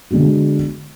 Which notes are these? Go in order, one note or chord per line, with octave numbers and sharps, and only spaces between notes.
D3 G#3 B3 F#4